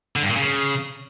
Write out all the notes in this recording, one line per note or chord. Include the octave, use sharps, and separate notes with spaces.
D3
G2
A#2
C#3